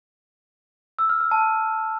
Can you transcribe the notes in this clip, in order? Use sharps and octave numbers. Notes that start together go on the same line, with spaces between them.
E6
F6
E6
A5